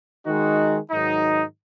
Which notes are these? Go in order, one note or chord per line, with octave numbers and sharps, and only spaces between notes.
D#3 G#3 D#4 F#4
G#2 D#3 F#3 D#4